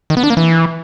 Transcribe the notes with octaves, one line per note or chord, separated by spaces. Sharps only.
D#3
B3
D4
A#3
E3